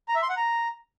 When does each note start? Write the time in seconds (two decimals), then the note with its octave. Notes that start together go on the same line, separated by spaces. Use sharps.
0.08 A#5
0.15 E5
0.22 C6
0.30 F#5
0.37 A#5